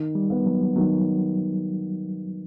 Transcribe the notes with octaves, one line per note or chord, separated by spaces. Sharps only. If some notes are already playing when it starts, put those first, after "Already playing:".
Already playing: D#3
G3
B3
F#3
D#3 F#3